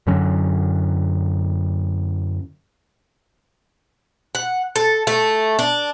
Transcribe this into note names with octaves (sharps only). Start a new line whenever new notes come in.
F#2 D3 F#3 C#4
F#5
A4
A3
D4